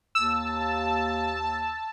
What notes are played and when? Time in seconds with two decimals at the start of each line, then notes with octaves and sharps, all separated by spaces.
0.15 D#2 A5 E6